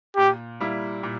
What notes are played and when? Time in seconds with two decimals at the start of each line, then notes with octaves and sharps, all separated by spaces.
0.17 A#2 G4
0.60 G3 A#3 E4
1.03 A#2